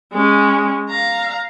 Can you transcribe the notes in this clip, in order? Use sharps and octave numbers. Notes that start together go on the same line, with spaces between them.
G#3 C#4
F5 A#5